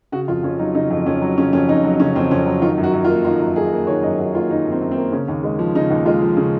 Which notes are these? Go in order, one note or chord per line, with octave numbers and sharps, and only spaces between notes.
C#3 F#4
F2 F4
F2 C#4
F#3 D#4
C#3 D#4
F2
F2 C#4
F#3
C#3 C#4
F2 C#4
F2 D#4
F#3
C#3 C#4
F2 C4
F2 C#4
F#3
D#3 F4
F#2
F#4
F#2
F4
A#3
D#3 F4
F#2
F#2 G#4
A#3
D#3 C#5
F#2 D#5
F#2 F#4
A#3 F4
D#3 D#4
F#2
C4
F#2
C4
A#3
C#3 C#4
D#2
G#3
F3
C#3 D#4
D#2
G#3 F4
F3
C#3